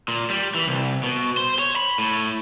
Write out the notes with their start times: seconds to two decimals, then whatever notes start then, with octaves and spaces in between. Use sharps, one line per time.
0.08 A#2
0.30 G3
0.55 E3
0.67 C2
1.03 B2
1.37 C5
1.59 C#5
1.76 B5
1.99 A2